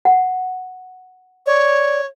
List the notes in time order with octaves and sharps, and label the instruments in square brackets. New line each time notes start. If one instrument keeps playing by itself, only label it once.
[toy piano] F#5
[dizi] C#5 [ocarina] D5